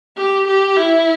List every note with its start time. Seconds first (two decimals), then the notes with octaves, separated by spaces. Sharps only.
0.17 G4
0.47 G4
0.76 E4